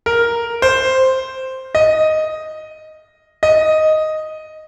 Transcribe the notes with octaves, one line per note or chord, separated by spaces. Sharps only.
A#4
C5
D#5
D#5